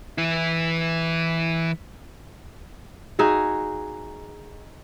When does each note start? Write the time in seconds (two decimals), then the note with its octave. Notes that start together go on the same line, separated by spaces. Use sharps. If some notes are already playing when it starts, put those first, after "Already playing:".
0.18 E3 E4
3.19 D#4 F#4 G#4 E5